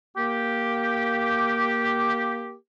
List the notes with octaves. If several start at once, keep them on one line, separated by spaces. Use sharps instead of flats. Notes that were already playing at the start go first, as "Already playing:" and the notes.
A#3 G4